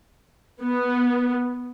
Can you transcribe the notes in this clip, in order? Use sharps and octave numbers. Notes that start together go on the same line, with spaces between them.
B3